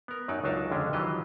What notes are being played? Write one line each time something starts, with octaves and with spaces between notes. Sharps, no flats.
B3 A#4
F#2 F#3 D#4 D5 G5
C#2 F#3 D4 D#4 A#4 A5
F2 D3 G#3 C#4 D4
D#3 E3 F#3 F4 G4 D#5